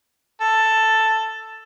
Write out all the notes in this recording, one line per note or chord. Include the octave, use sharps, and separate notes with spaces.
A4